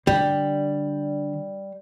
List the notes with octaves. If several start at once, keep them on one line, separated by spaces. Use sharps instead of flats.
D3 G3